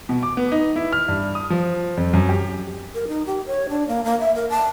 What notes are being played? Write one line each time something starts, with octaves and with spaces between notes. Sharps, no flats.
B2
D6
B3
D#4
E4
F6
G2
D#6
F3
F2
F#2
G4
A#4
D#4
G4
C#5
D4
A#3
A#3
E5
A#4
A5